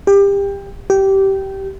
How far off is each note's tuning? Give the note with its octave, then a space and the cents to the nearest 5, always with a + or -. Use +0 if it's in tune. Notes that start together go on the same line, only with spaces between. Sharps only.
G4 +25
G4 -15